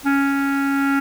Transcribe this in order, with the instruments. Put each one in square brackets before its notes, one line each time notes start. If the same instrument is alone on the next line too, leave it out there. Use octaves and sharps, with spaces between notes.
[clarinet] C#4